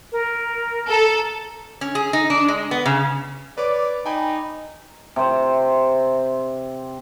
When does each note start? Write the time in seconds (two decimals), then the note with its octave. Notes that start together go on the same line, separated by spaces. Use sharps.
0.12 A#4
0.89 A4 A#5
1.81 C#4
1.95 G#4
2.13 D#4
2.30 D4
2.48 G#3
2.71 B3
2.85 C#3
3.58 B4 C#5 D5 D6
4.06 D#4 G5 G#5 B5
5.16 C3 C5